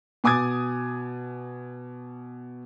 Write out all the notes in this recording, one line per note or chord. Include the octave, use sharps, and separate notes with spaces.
B2 G#5 D6 D#6 G#6 A6